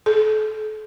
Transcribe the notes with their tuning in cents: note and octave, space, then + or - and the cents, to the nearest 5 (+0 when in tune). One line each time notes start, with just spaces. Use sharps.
A4 -35